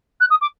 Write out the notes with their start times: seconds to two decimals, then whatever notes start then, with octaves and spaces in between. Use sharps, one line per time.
0.20 F#6
0.30 D#6
0.41 D6